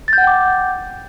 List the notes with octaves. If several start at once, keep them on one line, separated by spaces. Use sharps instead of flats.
F#5 G5 D6 G6 A6